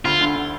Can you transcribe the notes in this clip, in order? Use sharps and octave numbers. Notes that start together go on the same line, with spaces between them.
D2 F4
D3
D3